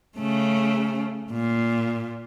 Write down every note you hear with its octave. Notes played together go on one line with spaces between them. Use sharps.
C#3 A3
A#2